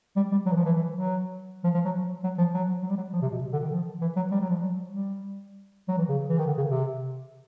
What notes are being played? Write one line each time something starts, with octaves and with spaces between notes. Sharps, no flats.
G3
G3
F#3
E3
F3
E3
E3
F#3
F3
F3
F#3
F#3
F3
F#3
F#3
G3
F#3
F3
C3
B2
C3
D3
D#3
F3
E3
F#3
G3
F#3
F3
F#3
G3
F#3
E3
C#3
E3
D#3
D3
C#3
C3